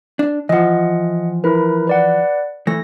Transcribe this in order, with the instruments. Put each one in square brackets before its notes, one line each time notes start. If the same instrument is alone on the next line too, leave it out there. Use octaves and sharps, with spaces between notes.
[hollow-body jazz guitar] D4
[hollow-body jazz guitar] E3 F3 [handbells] D#5 F#5
[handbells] E4 A#4 B4
B4 D5 F#5
[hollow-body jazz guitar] E3 A3 [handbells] A#6